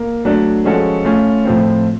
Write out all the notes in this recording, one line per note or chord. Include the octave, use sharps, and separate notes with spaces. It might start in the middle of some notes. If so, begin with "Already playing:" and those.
Already playing: A#3
F#3 A3 D4
F3 G#3 C#4 F#4 A4
A3 C#4 F4
A2 F3 A3 C4